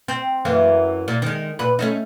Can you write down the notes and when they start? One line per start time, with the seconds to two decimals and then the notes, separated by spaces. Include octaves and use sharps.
0.08 C4
0.45 F#2 E3 A#3
1.08 A#2
1.22 D#3 G#3
1.59 A#2 B4
1.79 A3 C#4 D#4